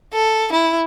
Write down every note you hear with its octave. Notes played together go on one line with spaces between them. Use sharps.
A4
E4